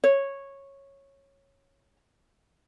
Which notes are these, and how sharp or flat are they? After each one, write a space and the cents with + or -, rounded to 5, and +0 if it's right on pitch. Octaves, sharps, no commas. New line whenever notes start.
C#5 -10